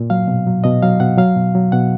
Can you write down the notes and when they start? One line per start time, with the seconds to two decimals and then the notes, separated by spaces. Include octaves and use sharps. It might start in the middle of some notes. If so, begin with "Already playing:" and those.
Already playing: A#2
0.10 F#3 F5
0.28 B2
0.47 F#3
0.64 B2 D#5
0.82 F#3 F5
1.00 B2 F#5
1.18 F#3 F5
1.36 B2
1.55 F#3
1.72 B2 F#5